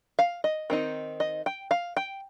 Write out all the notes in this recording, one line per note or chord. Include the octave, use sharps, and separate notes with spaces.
F5
D#5
D#3 C4 D#4
D#5
G5
F5
G5